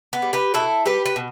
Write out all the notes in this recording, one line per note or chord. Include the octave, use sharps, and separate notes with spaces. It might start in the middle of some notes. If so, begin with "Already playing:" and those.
B3
G3
G4 B4
B2 E4 A4
G3 G4 B4
B4
B2